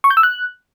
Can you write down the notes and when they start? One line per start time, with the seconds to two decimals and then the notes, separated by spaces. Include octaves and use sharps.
0.04 C#6
0.10 G6
0.17 E6
0.23 F#6